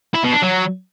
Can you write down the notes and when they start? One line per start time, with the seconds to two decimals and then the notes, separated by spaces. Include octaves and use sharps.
0.15 E4
0.24 B2
0.33 D4
0.43 F#3